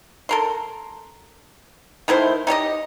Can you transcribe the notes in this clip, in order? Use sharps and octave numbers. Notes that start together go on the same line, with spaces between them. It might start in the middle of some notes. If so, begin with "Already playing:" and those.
A4 A#4 C6
D#3 A3 E4 C5
D#4 G4 C#5 D#5